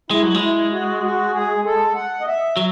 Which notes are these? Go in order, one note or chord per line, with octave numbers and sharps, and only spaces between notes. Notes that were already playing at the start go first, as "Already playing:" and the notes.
G#3 E4
F#3
G#3
E4
F#4
F#4
G#4
A4
F#5
D#5
E5
F#3